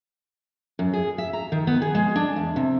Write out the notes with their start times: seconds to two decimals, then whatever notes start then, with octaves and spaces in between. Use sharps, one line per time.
0.79 F#2
0.93 G#4
1.18 E5
1.33 A#5
1.52 D#3
1.67 B3
1.82 G#4
1.95 G#3
2.16 D4
2.36 E2
2.56 C3